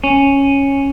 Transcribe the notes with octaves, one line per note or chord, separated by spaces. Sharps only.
C#4